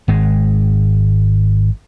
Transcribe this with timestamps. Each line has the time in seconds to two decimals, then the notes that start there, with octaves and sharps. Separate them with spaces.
0.08 G#1 G#3